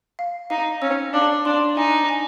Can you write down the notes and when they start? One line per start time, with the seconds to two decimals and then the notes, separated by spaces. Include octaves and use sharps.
0.19 F5
0.50 D#4 F5
0.82 C#4 E6
1.13 D4 F5
1.45 D4 C6
1.76 D#4 G#5
2.09 G#5